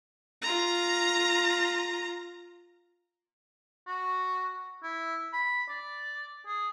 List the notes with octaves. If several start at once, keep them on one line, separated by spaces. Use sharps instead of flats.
F4 A#5
F#4
E4
B5
D5
G#4